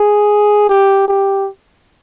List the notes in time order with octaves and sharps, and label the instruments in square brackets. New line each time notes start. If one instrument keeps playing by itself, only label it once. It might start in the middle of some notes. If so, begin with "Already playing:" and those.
Already playing: [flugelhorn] G#4
G4
G4